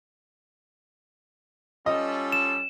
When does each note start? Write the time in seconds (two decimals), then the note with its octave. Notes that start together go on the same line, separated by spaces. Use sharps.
1.86 G3 C#4 F4 A4 D#5
2.32 E7